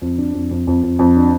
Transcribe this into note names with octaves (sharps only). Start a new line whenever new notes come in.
F2
D4
F2
F2
F2
F2
F2
D4